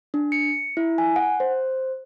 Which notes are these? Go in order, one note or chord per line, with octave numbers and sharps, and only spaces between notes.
D4
C#7
E4
G#5
F#5
C5